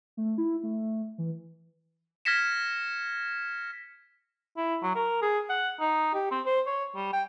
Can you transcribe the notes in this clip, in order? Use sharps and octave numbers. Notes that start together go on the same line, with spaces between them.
A3
E4
A3
E3
F6 G#6 A#6 B6 C#7 E7
E4
F#3
A#4
G#4
F#5
D#4
G4
C4
C5
C#5
G3
G5